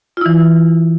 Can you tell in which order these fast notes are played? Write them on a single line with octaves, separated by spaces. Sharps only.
F4 E4 E3